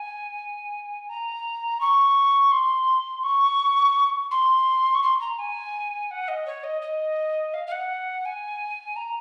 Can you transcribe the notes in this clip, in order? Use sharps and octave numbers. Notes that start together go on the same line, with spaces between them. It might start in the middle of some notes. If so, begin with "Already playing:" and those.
Already playing: G#5
A#5
C#6
C6
C#6
C6
C#6
C6
A#5
G#5
F#5
D#5
C#5
D#5
D#5
F5
F5
F#5
G#5
A#5